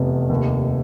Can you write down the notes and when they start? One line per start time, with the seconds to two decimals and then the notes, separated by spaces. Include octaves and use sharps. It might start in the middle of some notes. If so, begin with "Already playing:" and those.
Already playing: F1 E2
0.30 D#2